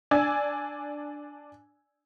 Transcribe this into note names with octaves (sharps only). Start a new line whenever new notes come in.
D4 D5 G#5 E6 G#6